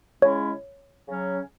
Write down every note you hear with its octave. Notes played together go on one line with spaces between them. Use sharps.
C#3 G#3 C#4 E4 C#5
C#3 F#3 C#4